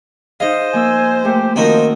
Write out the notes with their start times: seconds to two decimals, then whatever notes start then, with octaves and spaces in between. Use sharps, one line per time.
0.40 D#4 G#4 C5 D#5 F5
0.73 F3 A#3 G#5 E6
1.25 A3 A#3 G4
1.56 D#3 F3 C4 C#4 D#4 F#4 A#4